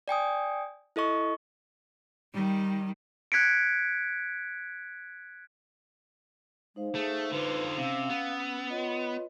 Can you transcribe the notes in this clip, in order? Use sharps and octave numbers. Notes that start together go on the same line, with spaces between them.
D5 G5 G#5 D#6
E4 A4 D#5 C#6
D#3 G3
F#6 G#6 B6 C#7 D7
G#3 D#4 C5 F5
A3 G#4
D3 F4 B4
C3 C#4 F5 E6
B3
F4 B4 C#5 D#5